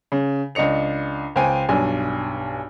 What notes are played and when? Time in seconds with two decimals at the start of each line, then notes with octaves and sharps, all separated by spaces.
0.12 C#3
0.55 C#2 D4 D#5 C#7 F7
1.36 C#2 C5 G5 G#5 D#7
1.69 B1 G2 D4 G#5